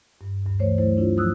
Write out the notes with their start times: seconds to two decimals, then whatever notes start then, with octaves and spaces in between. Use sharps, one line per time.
0.21 G2
0.46 D2 G2
0.59 E3 A3 C5 C#5
0.78 F#3 A3 E4 C5
0.97 D4 E4 F4 C#5
1.17 F3 F#3 D#6 E6 F#6